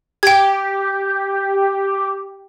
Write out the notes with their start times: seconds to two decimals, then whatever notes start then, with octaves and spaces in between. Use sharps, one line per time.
0.23 G4 G5 G#6